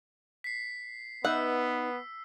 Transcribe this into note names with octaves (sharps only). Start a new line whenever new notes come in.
B6 C7
B3 D#4 B4 E5 F#5 E6